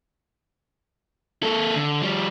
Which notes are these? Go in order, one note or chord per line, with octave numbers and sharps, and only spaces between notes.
A#3 A4
D3
F3 G3